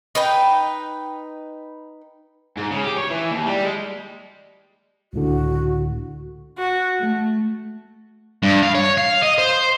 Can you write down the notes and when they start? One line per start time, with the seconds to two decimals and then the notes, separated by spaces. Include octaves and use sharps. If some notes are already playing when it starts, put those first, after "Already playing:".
0.15 D#4 B4 G5
2.57 G#2
2.71 C#3
2.84 G4
2.98 C#5
3.11 E3
3.31 D#2
3.47 G3
3.63 G#3
5.13 C#2 A2 D3 F#4
6.58 F#4
7.00 A3
8.43 G2
8.63 F5
8.75 C#5
8.98 F5
9.22 D#5
9.38 C5